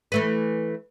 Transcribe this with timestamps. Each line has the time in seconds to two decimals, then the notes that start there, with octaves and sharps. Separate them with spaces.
0.12 E3 A3 B4